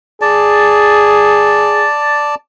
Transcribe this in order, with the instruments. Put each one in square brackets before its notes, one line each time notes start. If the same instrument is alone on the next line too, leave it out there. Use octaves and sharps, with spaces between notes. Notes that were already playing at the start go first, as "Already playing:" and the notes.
[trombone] G#4 [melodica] D5 A5